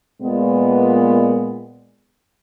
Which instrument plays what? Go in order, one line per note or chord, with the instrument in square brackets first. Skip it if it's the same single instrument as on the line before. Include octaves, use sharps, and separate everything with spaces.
[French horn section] A#2 G#3 B3